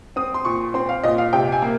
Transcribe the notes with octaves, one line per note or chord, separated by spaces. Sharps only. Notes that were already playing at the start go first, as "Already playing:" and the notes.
C4 D#6
C6
A#2 C#6
C4 C6
F5
A#2 D#5
F5
C3 G5
G#5
A#3